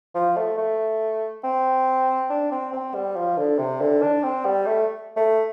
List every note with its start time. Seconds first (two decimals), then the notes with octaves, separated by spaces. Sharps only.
0.15 F3
0.37 A3
0.58 A3
1.44 C4
2.30 D4
2.51 C4
2.73 C4
2.94 G3
3.16 F3
3.37 D3
3.59 C3
3.81 D3
4.02 D4
4.23 C4
4.45 G3
4.66 A3
5.16 A3